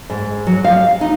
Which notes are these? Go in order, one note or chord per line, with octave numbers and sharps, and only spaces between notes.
G#2
F#3
F5
D#4